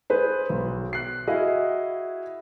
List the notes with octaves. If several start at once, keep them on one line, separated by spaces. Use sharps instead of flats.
G#4 B4 C5
B1
F#6 C7
E4 F#4 G#4 D#5 F5